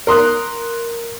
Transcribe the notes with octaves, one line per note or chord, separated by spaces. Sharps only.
A#4 C6 D#6 F#6